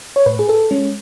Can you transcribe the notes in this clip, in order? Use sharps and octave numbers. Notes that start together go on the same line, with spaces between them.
C#5
A2 B4
G#4
A4
G#3 C#4